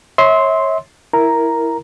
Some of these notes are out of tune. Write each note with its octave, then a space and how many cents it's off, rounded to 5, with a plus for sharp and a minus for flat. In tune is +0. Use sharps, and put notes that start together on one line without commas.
C#5 -20 E5 -35 C6 +0
E4 +0 A#4 +0 A#5 +0